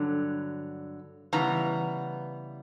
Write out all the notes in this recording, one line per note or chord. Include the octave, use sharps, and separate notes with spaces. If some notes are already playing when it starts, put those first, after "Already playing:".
Already playing: G2 D3 F#3
C#3 E3 G3 B3 A#5